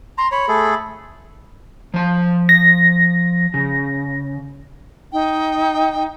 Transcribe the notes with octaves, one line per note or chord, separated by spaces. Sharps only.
A#5 C6
C#5 B5
A3 G#4 A4
F3 A5
A#6
C#3
D#4 G5